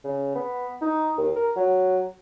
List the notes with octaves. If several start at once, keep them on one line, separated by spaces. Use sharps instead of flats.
C#3
B3
D#4
D#2
A#4
F#3